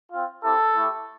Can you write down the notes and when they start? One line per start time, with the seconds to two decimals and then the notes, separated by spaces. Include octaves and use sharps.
0.11 C4 F4
0.42 C4 E4 G4 A4
0.74 A3 E4 G4